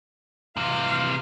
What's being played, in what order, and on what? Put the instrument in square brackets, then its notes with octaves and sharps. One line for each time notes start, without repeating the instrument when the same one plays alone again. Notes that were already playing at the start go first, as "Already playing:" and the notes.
[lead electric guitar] C3 E3 [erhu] F5